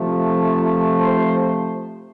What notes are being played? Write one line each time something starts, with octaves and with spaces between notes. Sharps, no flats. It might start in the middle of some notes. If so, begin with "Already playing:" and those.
Already playing: C3 F3 A3
C5